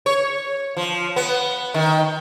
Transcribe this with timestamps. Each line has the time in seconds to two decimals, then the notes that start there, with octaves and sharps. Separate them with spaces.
0.06 C#5
0.77 F3
1.16 B3
1.74 D#3